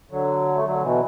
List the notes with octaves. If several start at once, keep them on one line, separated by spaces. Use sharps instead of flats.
D3 F#3
A3
D3 F#3
B2 E3